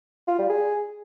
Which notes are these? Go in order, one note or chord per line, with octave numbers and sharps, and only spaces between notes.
F4
G3
G#4